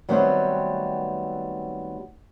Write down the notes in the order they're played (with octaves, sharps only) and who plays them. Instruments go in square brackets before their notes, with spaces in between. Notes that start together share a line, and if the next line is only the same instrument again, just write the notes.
[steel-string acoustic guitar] D#3 F#3 G3 A3 B3 C4